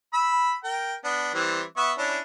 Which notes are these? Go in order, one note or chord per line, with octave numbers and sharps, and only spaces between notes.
B5 E6
A#4 G5
B3 D4
E3 G3 C4
B3 E5 C#6
C#4 D4 E4